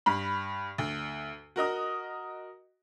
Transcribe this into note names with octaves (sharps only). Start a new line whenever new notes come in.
G2 B5
D2
F#4 A#4 D#5 D#6